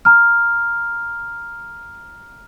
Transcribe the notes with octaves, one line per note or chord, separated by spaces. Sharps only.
A#5 F6